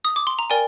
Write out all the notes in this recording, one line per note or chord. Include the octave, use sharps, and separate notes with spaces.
D#6
D6
C6
A#5
A#4 D5 G5 G#5